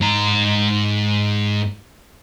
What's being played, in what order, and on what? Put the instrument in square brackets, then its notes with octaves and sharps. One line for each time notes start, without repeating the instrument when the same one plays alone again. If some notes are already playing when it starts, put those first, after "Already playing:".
[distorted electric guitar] G#2 A#5